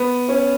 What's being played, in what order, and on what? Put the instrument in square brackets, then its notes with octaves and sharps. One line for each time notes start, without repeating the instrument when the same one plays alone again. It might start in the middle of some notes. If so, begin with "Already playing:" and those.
Already playing: [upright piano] B3
C#4